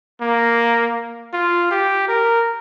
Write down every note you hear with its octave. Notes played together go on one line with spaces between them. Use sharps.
A#3
F4
G4
A#4